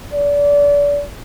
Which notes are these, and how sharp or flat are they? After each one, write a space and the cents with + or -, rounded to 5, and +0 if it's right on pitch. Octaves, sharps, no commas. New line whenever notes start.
D5 -30